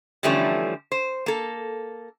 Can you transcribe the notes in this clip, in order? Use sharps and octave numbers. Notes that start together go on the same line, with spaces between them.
D3 E3 F3 G3 A3 C#4
C5
A#3 A4